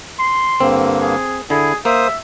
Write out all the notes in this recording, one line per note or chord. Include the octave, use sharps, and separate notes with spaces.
C6
G2 D3 A#3 C4
G#4
D3 E4 G#4
A#3 C5 E5 D#6